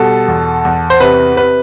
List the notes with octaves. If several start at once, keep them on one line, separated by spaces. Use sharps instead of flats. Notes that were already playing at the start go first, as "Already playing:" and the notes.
Already playing: B2 G3 A4
E2
E2
C5
C3 B4
C3 B4